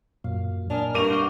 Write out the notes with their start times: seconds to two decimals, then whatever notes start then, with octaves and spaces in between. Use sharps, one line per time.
0.24 F#2 A#2 F5
0.70 A#3 D4 D#5 G#5 F6
0.94 G2 A#4 C#6 D6 D#7 F7
1.10 F#5 C6 G6